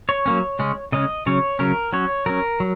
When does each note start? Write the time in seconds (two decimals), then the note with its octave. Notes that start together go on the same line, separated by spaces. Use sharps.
0.09 C#5
0.26 F#3 A#3 C#4
0.59 C#3 G#3 C#4
0.92 C#3 G#3 C#4 D#5
1.26 C#3 F#3 C#4 C#5
1.59 C#3 F#3 C#4 A#4
1.93 F#3 C#4 C#5
2.26 F#3 C#4 A#4
2.60 F#3